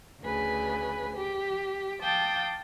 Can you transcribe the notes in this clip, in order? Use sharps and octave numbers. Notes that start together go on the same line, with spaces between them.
D2 C#3 B4 G#5
G4
F5 G5 A5 D6 D#6